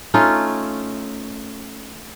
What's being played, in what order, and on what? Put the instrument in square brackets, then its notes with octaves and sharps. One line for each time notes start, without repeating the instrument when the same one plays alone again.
[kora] A3 C#4 D#4 F4